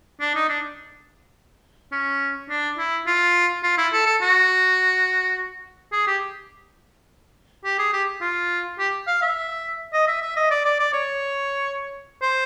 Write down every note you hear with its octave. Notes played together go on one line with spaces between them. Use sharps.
D4
D#4
D4
C#4
D4
E4
F4
F4
E4
A4
A4
F#4
G#4
G4
G4
G#4
G4
F4
G4
F5
E5
D#5
E5
E5
D#5
D5
D5
D5
C#5
C5